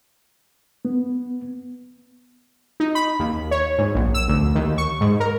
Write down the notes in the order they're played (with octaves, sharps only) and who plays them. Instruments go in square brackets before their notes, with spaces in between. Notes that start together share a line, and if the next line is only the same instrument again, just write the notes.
[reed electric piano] B3
[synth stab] D#4
B5
D#2
C#5
G#2
A#1
E6
D2
D#2
C#6
G#2
A#4